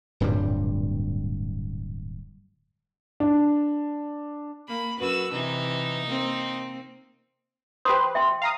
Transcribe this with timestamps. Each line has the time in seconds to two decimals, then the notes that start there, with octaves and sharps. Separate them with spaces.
0.20 D1 G2 A#2 G3
3.20 D4
4.68 A#3 B5
4.99 F#2 F#4 B4 E6
5.32 C3 E3 D#4
6.06 A#3 C4
7.85 G4 B4 C5 C6 D#6
8.15 E5 G5 C6
8.42 F5 A#5 D#6